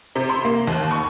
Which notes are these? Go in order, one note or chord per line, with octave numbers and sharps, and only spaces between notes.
C3
C6
A#3
D#2
C#6